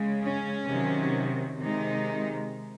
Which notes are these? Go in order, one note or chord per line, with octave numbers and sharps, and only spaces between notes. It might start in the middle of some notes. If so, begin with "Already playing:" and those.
Already playing: C#3 G#3
C#4
C3 D#3 F#3
C3 D#3 G#3 D#4